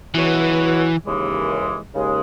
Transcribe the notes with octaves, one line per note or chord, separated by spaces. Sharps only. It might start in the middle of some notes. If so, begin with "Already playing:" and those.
C#2 B2 E3 F#3 B3 F#4
D#2 C#3 E3 G#3
D#2 C#3 G#3